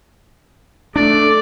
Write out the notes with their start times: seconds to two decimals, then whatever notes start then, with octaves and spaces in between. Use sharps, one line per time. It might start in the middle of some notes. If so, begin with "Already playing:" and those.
0.96 A3 D4 D5